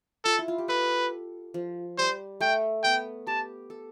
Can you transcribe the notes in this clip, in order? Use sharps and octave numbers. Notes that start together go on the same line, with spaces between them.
F4 A4
E4
F4
G4
A4 B4
F3
G3 C5
A3 G5
B3 G5
G4 A5
A4